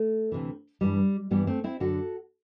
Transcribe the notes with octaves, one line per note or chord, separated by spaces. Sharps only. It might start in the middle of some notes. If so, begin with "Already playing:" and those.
Already playing: A3
D2 C3 E3
G2 E3 G3
G2 E3 G3 B3
A3 C4
C4 E4
F#2 D3 F#4 A4